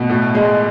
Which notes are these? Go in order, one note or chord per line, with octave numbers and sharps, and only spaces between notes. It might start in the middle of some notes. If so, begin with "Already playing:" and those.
Already playing: B2 A3
A2
G#3